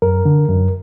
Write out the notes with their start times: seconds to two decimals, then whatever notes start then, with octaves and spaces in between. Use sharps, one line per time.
0.02 F#2 A#4
0.25 D3
0.48 F#2